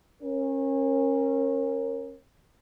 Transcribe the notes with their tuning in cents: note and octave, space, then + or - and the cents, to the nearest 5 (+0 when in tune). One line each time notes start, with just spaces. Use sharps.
C#4 -30 A#4 +0